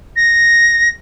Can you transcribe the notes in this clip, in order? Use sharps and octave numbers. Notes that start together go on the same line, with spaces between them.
A#6